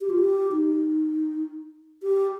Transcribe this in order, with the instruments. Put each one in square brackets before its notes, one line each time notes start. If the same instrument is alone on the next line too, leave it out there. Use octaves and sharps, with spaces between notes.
[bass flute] G4
F4
G4
D#4
G4